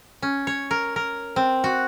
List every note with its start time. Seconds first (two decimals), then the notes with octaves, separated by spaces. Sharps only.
0.22 C#4
0.47 C#5
0.71 A#4
0.96 A#4
1.36 C4
1.64 F#4